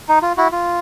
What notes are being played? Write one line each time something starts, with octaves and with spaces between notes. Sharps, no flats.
D#4
F4
E4 F#4
F4